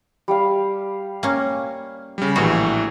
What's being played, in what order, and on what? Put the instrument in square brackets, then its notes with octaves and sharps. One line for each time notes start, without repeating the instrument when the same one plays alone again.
[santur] G3 G4 F5
[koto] A#3 C#4
[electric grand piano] C#3 G3
[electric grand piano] A#1 A2 E3 [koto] F#4